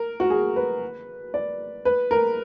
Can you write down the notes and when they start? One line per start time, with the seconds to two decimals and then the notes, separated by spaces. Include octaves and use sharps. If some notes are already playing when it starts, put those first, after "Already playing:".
Already playing: A#4
0.20 F#4
0.30 G#4
0.56 B4
1.34 D5
1.85 B4
2.11 A#4